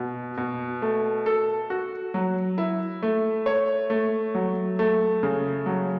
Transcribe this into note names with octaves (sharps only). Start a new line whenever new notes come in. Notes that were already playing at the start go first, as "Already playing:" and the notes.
Already playing: B2
B2
A3
A4
F#4
F#3
E4
A3
C#5
A3
F#3
A3
C#3
F#3